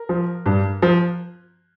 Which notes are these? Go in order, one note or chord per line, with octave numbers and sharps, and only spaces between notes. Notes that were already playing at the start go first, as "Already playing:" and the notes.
Already playing: A#4
F3
G2
F3